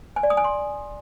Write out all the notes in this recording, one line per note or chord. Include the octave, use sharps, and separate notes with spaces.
G#5
D5
D#6
G#5
C6